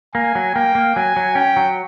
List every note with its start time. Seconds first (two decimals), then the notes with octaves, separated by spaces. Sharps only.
0.15 A#3 G#5
0.35 F#3
0.55 A#3 G5
0.75 A#3
0.96 F#3 G#5
1.17 F#3
1.35 C#4 G5
1.57 F#3